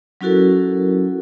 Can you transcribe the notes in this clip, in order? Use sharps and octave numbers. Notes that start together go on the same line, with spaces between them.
F#3 C#4 E4 F#4 A4 A#4